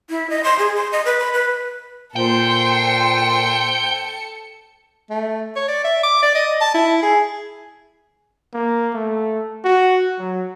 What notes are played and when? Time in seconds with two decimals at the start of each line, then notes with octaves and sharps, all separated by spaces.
0.10 E4
0.30 D#5
0.44 C6
0.59 G#4
0.76 C6
0.92 D#5
1.06 B4
1.19 B5
1.34 B4
2.16 A#2 A4 C5 G5 C#7
5.10 A3
5.56 C#5
5.68 D5
5.84 E5
6.03 D6
6.22 D5
6.35 D#5
6.61 A5
6.74 E4
7.02 G#4
8.53 A#3
8.94 A3
9.64 F#4
10.19 F#3